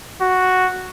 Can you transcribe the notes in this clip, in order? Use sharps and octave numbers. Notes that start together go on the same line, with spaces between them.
F#4